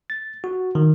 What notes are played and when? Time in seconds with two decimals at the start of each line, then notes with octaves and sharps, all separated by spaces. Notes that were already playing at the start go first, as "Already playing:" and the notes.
0.10 A6
0.44 F#4
0.75 D#3